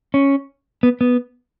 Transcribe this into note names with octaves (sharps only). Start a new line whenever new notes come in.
C#4
B3
B3